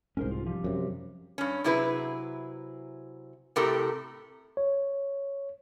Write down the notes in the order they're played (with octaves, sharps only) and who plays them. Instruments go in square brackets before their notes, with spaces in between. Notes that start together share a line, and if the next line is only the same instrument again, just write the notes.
[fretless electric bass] C2 G#2 [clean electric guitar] C#4 A#4 C5
[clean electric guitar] F4
F3 G3
[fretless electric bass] F#2 C3
[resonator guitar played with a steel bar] G2 C#4
C3 F#3 E4 G#4 B4
A2 C3 C4 G4 A4 A#4
[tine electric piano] C#5